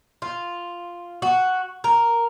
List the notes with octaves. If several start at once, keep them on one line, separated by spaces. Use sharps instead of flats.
F4
F#4
A#4